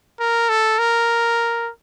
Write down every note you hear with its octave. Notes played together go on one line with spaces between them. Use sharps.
A#4
A4
A#4